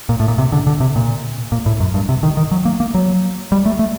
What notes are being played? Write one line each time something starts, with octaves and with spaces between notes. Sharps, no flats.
A#2
A2
A#2
C3
D3
D3
C3
A#2
A#2
A2
F#2
G2
C3
D#3
D#3
F#3
A#3
A#3
F#3
G3
A3
A3